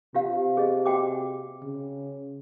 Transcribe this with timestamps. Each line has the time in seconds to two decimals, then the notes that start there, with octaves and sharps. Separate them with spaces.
0.15 C3 F4 G4 F5
0.57 G#4 D#5
0.86 F#4 G5 D6
1.62 C#3